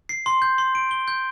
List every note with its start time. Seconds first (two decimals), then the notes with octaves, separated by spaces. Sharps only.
0.09 C7
0.26 C6
0.42 G6
0.58 C6
0.75 D7
0.91 G7
1.08 G6